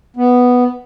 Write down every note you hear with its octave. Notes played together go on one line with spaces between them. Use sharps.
B3